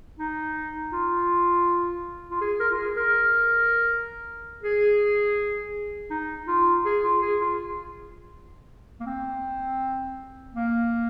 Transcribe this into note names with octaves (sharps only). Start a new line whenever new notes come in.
D#4
F4
F4
G#4
A#4
F4
G#4
A#4
G#4
D#4
F4
G#4
F4
G#4
F4
A#3
C4
A#3